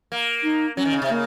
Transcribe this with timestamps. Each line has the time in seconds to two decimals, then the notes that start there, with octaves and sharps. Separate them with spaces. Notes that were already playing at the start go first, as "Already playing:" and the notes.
0.12 A#3
0.43 D#4
0.77 F#3 C#4
0.85 D#3
0.93 C#3
1.02 C3
1.09 C#3 A#3